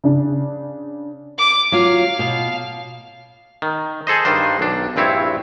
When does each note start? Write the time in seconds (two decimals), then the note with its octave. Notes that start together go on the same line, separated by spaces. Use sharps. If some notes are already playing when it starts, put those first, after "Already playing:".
0.04 C#3 D4
1.38 D6
1.72 F#3 F4 F5
2.19 B2
3.62 D#3
4.07 G#4 A4 C5 D#5
4.25 G2 D#3 D4 C5
4.59 B1 D4
4.96 A#1 G2 C4 E4 C#5